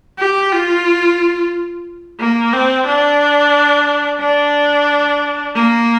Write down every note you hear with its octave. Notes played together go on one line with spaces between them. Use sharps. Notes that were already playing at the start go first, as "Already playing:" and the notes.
G4
F4
A#3
C4
D4
D4
A#3